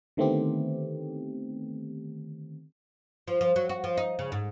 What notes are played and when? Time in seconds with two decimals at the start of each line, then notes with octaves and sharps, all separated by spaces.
0.17 D3 D#3 A3 B3 C4 G4
3.28 F3
3.41 F3
3.56 F#3
3.69 F#4
3.84 F3
3.98 D#4
4.19 C#3
4.32 G#2